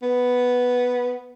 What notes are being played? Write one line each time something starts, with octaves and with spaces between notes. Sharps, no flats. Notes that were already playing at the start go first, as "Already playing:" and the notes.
B3